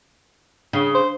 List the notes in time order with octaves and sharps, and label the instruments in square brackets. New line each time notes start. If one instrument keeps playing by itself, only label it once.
[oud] C#3 [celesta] D4 C7 G7
[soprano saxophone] C5